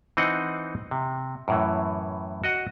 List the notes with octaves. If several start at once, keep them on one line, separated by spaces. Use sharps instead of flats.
E3 C4 D#4 D#5 F#5
C3
F#2 A2 E3
F#4 D#5 F#5